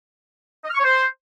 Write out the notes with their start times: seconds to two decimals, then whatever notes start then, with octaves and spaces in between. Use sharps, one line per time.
0.64 D#5
0.69 F6
0.74 C#6
0.79 C#5
0.84 C5